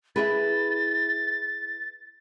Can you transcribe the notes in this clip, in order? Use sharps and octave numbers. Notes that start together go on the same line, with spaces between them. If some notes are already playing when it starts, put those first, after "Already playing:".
E4 G#4 B4 A6